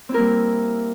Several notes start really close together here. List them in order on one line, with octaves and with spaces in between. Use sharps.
C4 E4 A#4 A#3 G3